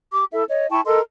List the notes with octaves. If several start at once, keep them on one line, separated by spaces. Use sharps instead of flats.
G4 D6
E4 A4 E5
C#5 D#5
E4 G5 A5 C#6
A4 A#4 D#5 C6